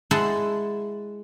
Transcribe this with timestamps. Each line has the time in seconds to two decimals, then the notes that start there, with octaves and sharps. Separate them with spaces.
0.11 G#3 E4 F#5 A5 C6